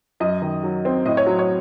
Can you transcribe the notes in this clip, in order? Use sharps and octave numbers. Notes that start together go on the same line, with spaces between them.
F#2 D#5
D#3
F#3
C4
A2 D#5
C#5
F#3
C#5